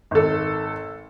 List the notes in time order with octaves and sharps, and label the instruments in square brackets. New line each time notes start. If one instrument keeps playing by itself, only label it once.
[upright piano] G#1 A4